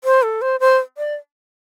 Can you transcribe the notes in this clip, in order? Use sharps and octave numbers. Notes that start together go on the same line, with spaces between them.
C5
A4
C5
C5
D5